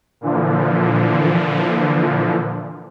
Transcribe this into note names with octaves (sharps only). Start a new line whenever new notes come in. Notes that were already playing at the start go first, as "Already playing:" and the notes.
A#2 D3 E3 F3